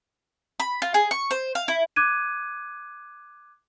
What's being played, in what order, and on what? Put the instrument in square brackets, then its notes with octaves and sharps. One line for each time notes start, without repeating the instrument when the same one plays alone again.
[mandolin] B5
F4
G#4
C#6
C5
F5
E4
[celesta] D6 F#6 G#6 D#7